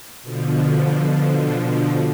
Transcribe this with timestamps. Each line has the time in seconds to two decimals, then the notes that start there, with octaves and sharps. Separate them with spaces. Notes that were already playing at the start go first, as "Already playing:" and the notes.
0.22 B2 D3 F3